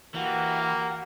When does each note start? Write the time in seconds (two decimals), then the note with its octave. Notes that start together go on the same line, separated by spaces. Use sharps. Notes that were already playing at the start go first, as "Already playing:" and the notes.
0.15 E3 A#3 F#4 G4